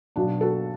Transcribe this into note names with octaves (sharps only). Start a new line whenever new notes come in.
B1 B2 D4 F#4
F#4 A4